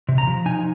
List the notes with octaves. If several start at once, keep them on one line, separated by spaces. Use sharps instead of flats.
C3
A#5
F3
D#4 G#5